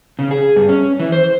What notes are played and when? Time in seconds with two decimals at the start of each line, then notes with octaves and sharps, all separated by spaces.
0.19 C#3
0.31 G#4
0.56 G2
0.69 C#4
0.99 E3
1.12 C5